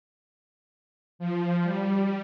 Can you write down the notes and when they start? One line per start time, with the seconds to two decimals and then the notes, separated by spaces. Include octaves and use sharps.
1.19 F3
1.64 G3